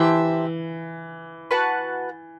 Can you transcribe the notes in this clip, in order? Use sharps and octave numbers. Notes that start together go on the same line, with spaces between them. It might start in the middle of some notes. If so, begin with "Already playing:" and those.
Already playing: E3 G4 C5 E5 A5
F#4 B4 F#5 A5